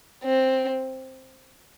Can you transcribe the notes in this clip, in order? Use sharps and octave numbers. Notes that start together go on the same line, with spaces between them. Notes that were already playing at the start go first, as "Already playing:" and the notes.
C4